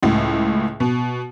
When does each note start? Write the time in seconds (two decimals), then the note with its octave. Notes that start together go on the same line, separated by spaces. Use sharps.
0.03 C#2 A2
0.80 B2